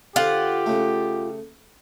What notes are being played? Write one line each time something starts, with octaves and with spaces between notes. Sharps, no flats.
D3 F4 G4 C5 F#5
C#3 A3